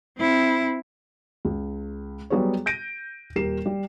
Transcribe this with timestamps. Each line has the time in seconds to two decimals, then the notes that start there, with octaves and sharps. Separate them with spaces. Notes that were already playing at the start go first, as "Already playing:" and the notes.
0.18 C4 E4
1.45 C#2
2.30 F#3 G3 B3 G#4 B4 C#5
2.66 G6 A#6 D7 D#7
3.36 D#1 G4 A#4 C7 E7
3.66 G3